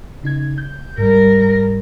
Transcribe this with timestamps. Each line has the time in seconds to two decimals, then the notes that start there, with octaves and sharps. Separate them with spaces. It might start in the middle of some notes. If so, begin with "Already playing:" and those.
0.23 C#3 D#4 G#6
0.58 G6
0.98 G#2 G3 A#4
1.41 G#2